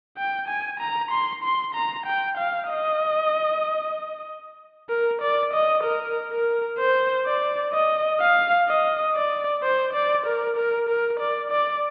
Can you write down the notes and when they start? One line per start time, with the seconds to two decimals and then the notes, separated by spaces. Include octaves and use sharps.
0.17 G5
0.48 G#5
0.80 A#5
1.11 C6
1.43 C6
1.75 A#5
2.06 G5
2.38 F5
2.69 D#5
4.90 A#4
5.21 D5
5.53 D#5
5.84 A#4
6.32 A#4
6.78 C5
7.26 D5
7.73 D#5
8.21 F5
8.68 D#5
9.15 D5
9.63 C5
9.93 D5
10.26 A#4
10.56 A#4
10.89 A#4
11.19 D5
11.51 D5